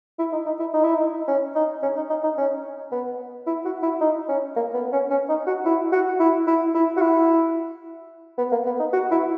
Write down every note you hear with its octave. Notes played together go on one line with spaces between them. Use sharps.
E4
D#4
D#4
E4
D#4
E4
D#4
C#4
D#4
C#4
D#4
D#4
D#4
C#4
B3
E4
F#4
E4
D#4
C#4
A#3
B3
C#4
C#4
D#4
F#4
E4
F#4
E4
E4
E4
F#4
E4
B3
A#3
B3
D#4
F#4
E4